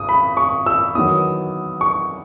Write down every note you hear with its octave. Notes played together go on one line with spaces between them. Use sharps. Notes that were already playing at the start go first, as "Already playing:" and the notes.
Already playing: G#1 D#6
B5
C#6
E6
E2 D#3 F#3 B3 D#6
C#6